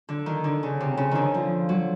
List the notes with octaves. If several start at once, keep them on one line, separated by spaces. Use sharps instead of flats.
D3
D#3
D3
C#3
C3
C#3
D3 D#3
F3
F#3